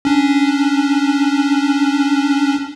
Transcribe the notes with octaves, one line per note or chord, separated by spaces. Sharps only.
C#4 D4